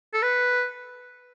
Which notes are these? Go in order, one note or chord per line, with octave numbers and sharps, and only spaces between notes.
A4
B4